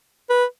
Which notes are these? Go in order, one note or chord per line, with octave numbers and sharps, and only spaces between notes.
B4